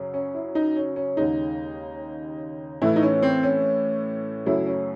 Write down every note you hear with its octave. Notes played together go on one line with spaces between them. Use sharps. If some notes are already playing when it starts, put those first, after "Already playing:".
Already playing: F#2 C#3 F#3
C#4
E4
D#4
C#4
C#4
D#2 C#3 G#3 D#4
A2 E3 A3 E4
D#4
C#4
C4
C#4
F#2 C#3 F#3 A3 E4
C#4